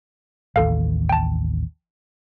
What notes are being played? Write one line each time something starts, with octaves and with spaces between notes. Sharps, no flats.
A1 D#2 A4 F5
G5 A5